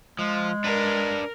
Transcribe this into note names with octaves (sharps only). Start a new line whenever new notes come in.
F3 G#3
D4 A#4 B4